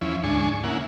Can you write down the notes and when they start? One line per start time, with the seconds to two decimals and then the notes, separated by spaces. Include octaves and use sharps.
0.01 E2 F3 C#4 E4
0.24 D2 G#2 D4 G#5 C#6
0.64 C#3 A#3 E4 F#5